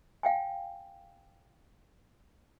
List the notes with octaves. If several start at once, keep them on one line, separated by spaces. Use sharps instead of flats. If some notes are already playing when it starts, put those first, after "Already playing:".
F5 G5 G#5